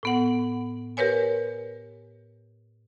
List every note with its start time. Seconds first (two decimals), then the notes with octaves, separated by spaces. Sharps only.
0.03 A2 B3 F#5
0.97 G4 A#4 B4 C#5 G#5